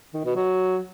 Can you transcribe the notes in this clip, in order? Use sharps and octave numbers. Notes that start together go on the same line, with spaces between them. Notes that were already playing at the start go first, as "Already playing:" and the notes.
D#3
B2
F#3